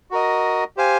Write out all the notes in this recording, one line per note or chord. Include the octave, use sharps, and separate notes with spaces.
F#4 A#4 D#5
G4 C5 F5 G#5